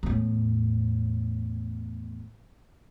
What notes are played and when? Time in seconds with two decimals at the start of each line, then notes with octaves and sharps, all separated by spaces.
0.03 E2 A2